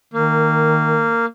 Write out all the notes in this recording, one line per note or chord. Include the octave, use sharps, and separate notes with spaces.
D#3 A#3